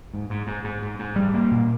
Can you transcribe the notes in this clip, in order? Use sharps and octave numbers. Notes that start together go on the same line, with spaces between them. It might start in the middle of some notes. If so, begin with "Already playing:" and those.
G#2
G#2
G#2
G#2
G#2
G#2
G3
A#3
A#2